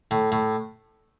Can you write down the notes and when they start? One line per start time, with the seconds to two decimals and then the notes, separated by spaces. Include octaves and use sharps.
0.11 A2
0.32 A2